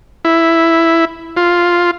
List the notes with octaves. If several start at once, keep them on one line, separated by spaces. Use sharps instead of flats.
E4
F4